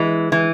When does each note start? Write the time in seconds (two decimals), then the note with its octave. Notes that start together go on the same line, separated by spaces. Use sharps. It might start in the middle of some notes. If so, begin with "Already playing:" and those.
Already playing: E3 G#3
0.32 E3